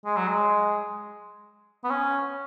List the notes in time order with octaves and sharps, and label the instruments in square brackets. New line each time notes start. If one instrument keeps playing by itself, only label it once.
[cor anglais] G#3
F#3
G#3
B3
C#4